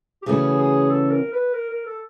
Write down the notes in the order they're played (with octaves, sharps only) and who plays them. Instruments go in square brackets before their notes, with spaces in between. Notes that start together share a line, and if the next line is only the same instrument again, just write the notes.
[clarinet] G4
[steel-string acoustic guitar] C#3 E3 A3 C#4 F#4 [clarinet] G#4
[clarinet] G#4
A4
A#4
B4
A#4
A#4
A4